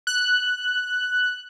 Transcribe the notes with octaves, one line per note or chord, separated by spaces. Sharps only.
F#6